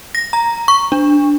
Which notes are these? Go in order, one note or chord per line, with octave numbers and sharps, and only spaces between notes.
A#6
A#5
C#6
D4